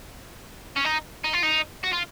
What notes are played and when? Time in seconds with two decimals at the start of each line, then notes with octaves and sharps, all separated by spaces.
0.77 C#4
0.85 D#4
1.25 D#4
1.34 F4
1.43 D#4
1.84 F#4
1.93 F4